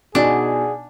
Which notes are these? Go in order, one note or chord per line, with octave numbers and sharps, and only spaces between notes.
B2 D4 D#4 G#4 D5 F#5 G#5